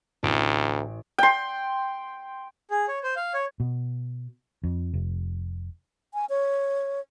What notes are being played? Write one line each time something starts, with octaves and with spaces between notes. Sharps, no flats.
A1 D2 D7
G5 C6
G#4
C#5
C5
F5
C#5
B2
F2
F1
G#5
C#5